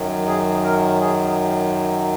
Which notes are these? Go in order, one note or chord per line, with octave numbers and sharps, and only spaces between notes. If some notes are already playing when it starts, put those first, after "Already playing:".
Already playing: F#2 D#3 F#3
G#4
A#4
G#4